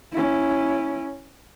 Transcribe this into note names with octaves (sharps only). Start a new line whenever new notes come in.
C#4 E4